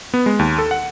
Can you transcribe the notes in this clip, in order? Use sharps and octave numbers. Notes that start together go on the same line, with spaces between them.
B3
G#3
D#2
A4
F#5